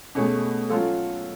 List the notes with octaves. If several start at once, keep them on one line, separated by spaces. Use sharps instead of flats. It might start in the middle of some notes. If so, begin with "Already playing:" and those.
B2 A3 C#4 G#4
F#3 C#4 F4 A4